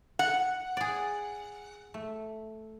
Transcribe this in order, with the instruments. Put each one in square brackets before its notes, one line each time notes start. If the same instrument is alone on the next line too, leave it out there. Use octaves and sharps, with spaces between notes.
[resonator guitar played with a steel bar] F#5
[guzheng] G#4 D5
A3